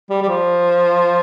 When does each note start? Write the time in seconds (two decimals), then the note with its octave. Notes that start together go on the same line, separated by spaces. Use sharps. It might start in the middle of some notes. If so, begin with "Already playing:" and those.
0.10 G3
0.22 G3
0.28 F3